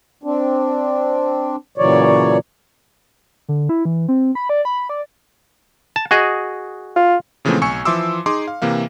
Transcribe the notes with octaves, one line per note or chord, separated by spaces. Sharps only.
C4 D4
A#2 C#3 E3 F#3 C#5 D5
D3
E4
E3
C4
B5
D5
B5
D5
A5
F#4 G#4 D#5
F4
A#2 C#3 E3 F3 A3 C4
B1 G#5 C#6 E6 C#7
E3 F3 E5 C6 D6 E6
D#4 G#4 C6 D6
F5
C3 E3 A#3 F5